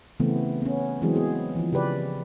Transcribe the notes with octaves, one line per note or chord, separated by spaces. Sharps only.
C#3 E3 A3 B3 C4
B3 C#4
E3 F#3 G#3 C4 G#4
B3 G#4
E3 F3
C#3 G4 B4 D5